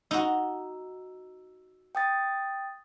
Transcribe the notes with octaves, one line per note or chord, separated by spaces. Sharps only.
D#4 F#4 E6
G5 D#6 A6